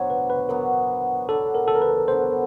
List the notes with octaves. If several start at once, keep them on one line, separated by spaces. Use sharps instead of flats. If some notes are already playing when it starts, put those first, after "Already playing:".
Already playing: F#3 B3 D4 C5 C#5
B4
B4
F#3 B3 D4 A#4
F#3 B3 D4 A4
A#4
A4
A#4
B4
F#3 B3 D4 C5